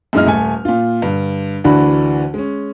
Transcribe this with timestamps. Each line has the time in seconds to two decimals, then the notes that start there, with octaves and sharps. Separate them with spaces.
0.13 F#2 A#2 G#3 E4 D#5 F6
0.27 D#1 A3 G#5
0.65 A#2 F4
1.02 G2 D3
1.64 D2 D3 E3 D4 F#4 B5
2.34 G#3 C#4